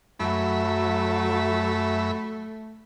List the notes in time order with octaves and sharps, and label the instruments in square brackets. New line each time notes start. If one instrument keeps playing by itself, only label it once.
[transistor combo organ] F#2 E5 B5 [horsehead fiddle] F#3 [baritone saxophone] A3